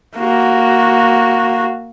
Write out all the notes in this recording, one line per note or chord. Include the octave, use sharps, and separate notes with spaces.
A#3 F#4